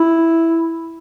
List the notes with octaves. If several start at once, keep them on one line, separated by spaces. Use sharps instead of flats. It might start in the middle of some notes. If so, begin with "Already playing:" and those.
Already playing: E4